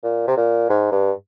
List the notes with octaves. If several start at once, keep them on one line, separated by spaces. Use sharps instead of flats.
A#2
C3
A#2
G#2
G2